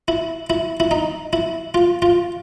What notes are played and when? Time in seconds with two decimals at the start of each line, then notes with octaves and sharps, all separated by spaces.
0.08 E4
0.50 E4
0.80 E4
0.91 D#4
1.33 E4
1.74 F4
2.02 F4